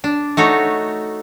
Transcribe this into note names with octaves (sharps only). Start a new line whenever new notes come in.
D4
A3 D#4 F#4 C#5